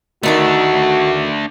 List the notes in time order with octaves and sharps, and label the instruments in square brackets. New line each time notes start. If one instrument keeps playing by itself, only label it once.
[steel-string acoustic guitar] D2 D#3 A4 [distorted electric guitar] A3 D4 [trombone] F#4